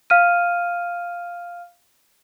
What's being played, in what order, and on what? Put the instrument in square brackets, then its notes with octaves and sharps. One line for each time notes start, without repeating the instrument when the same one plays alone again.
[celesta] F5 F6 D#7